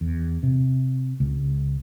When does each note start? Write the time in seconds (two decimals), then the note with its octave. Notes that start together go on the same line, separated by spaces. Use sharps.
0.01 E2
0.43 C3
1.20 C#2